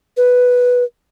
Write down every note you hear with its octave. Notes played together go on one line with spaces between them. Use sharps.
B4